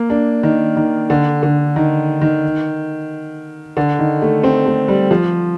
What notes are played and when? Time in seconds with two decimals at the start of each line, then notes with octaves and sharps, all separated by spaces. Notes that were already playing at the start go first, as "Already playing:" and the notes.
Already playing: A#3
0.10 D4
0.43 D#3
0.76 D#3
1.10 D3
1.43 D3
1.76 D#3
2.21 D#3
3.77 D3
3.99 D#3
4.22 A3
4.43 C4
4.66 A3
4.88 G3
5.11 F3